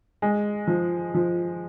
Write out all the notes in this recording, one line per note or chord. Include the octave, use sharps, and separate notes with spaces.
G#3
F3
F3